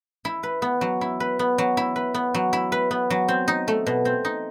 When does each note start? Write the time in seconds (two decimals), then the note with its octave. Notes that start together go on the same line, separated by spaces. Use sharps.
0.25 E4
0.43 B4
0.62 B3
0.81 F#3
1.01 E4
1.20 B4
1.39 B3
1.58 F#3
1.77 E4
1.96 B4
2.14 B3
2.34 F#3
2.53 E4
2.72 B4
2.91 B3
3.10 F#3
3.28 C4
3.48 D#4
3.68 A3
3.87 B2
4.05 C4
4.25 D#4